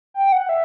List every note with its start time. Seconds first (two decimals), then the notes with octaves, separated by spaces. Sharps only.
0.14 G5
0.32 F#5
0.49 E5